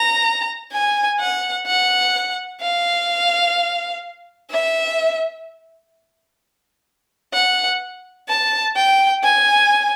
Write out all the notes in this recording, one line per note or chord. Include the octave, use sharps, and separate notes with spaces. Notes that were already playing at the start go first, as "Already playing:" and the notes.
Already playing: A#5
G#5
F#5
F#5
F5
E5
F#5
A5
G5
G#5